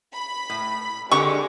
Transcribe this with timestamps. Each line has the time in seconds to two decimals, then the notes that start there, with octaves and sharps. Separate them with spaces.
0.16 B5
0.50 A2
1.11 D3 G#3 G4 C#6